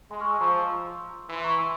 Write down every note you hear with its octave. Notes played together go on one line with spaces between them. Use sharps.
G#3 G#5 C6
C#6 F6
C6 E6
F3 A#5 C#6
C6 E6
E3 C6 E6
A#5 C#6
C6 E6